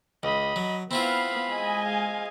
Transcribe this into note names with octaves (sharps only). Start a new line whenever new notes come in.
C#2 D#5 B5
F#3
B3 C4 E4 F4 F5 B5
G#3 D#5 G#5
F5